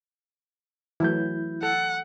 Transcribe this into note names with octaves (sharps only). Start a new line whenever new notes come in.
E3 F#3 A3 E4 G6
A4 F#5